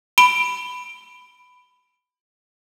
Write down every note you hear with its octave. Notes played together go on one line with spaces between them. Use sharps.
B5 D7 G7